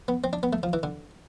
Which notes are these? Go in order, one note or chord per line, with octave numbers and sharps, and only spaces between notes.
B3
C4
D4
B3
A3
F3
E3
D3